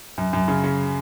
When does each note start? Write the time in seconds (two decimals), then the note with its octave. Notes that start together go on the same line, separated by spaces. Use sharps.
0.18 F#2
0.33 F#2
0.48 C#3
0.64 C#3